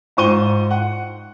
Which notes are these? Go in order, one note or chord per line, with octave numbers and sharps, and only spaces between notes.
G#2 F4 C5 C#6 D#7 G7
F#5